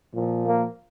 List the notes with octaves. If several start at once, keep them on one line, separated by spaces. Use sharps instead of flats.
A#2 F3
A#3